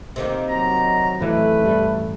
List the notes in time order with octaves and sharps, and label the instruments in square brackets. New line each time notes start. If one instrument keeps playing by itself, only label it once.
[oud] C3 D#3 A#3
[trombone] F#3 [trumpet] A#5
[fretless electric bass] A2 E3 F#3 [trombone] A3 [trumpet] B4
[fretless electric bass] A1 G2 G3